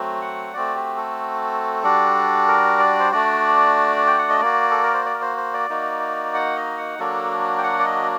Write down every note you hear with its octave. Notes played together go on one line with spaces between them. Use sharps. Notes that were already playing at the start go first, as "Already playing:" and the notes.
Already playing: F#3 A3 C4 F#4
F#5
A3 C4 F#4 D5
G4
A4
G3 D4 F#4
A#4
D5
C5
A3 D4 F#4 D5
G5
F#5
D#5
A#3 F#4 D5
A4
A#4
C5
D5
A#4
C5
C5
D5
A#3 D#4 F#4
F#5
D#5
F#5
F#3 A#3 D4 F#4 A4
G5
F#5
D5
D#5